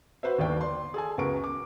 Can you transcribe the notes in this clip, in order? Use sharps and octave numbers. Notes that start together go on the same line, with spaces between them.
F#4 B4 C5 E5
G1 D#2 B3 D5 G5
D5 C6
G#4 A4 G#5
C#2 F#2 B3 A#4 C#6 D7
D6